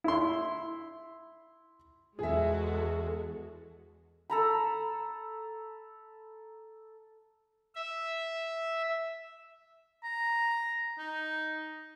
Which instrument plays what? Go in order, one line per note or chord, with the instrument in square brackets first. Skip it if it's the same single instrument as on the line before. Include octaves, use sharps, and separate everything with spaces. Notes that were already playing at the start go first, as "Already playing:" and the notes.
[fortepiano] E4 C6
[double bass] E2 [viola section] G#3 F#4 A4 [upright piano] G#4 E5
[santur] A4 A#5 B5
[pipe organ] E5
[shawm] A#5
D#4